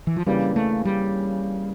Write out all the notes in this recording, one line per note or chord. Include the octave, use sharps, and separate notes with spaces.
E3
F3
C#3 E3 G3 A#3 D4
A3
G3